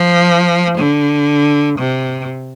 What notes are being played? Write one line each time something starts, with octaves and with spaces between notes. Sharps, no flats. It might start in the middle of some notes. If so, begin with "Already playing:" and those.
Already playing: F3
D3
C3